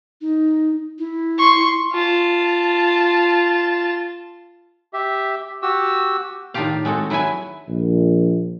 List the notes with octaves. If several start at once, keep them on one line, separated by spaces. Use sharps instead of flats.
D#4
E4
C6 C#6
F4 A5
G4 E5
F#4 G4 E6
A2 D#3 D4 F4 G4 F5
G#3 C4 F#4 A4
F#3 E4 B4 E5 G#5
A#1